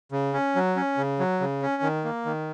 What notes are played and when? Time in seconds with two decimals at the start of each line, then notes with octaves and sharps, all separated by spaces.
0.12 C#3
0.34 C#4
0.56 F#3
0.76 C#4
0.97 C#3
1.19 F#3
1.40 C#3
1.62 C#4
1.82 D#3
2.04 A#3
2.25 D#3